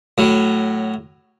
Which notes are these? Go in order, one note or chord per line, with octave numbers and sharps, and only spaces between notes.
A2 F#3